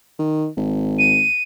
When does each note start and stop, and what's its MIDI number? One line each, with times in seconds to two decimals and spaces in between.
0.19 0.47 51
0.57 1.24 32
0.99 1.43 99